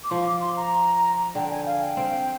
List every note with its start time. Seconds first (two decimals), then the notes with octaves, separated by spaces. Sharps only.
0.04 D6
0.10 F3 C6
0.26 D6
0.41 C6
0.57 A#5
1.35 D3 G5
1.50 G#5
1.66 F5
1.81 G5
1.97 C4